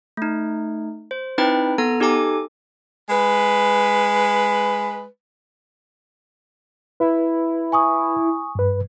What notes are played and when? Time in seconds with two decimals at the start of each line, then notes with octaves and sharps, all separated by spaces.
0.17 A3 D#4
1.11 C5
1.38 C4 D#4 E4 B4 G5 B5
1.78 B3 A4 A#5
2.00 D#4 G4 A4 G#5 D6
3.10 G#3 B4
7.00 E4 B4
7.72 G#5 C#6 D#6
8.55 G2 B4